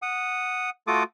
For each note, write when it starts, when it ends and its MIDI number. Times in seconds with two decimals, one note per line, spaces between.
0.02 0.70 78
0.02 0.70 87
0.87 1.03 57
0.87 1.03 65
0.87 1.03 66
0.87 1.03 69
0.87 1.03 86
0.87 1.03 87